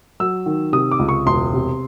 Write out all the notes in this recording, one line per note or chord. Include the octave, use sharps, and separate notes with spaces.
F#3 E6
D#3
C3 D#6
D6
C#2
C#6
E1 C6
C3